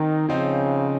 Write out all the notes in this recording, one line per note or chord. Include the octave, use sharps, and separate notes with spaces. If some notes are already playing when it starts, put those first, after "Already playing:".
Already playing: D#3 C4 D#4
C#3 F3 C4 D#4